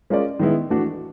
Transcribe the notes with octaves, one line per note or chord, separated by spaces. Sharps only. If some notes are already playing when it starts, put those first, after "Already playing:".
G#3 C#4 F4 A#4 D5
D#3 G#3 B3 E4
E3 A3 D4 F#4